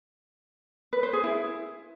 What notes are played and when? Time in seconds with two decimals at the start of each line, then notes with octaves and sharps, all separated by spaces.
0.93 B4
1.03 C5
1.13 G#4
1.24 E4